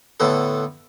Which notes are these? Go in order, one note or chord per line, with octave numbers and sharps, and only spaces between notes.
A2 D3 B3 A4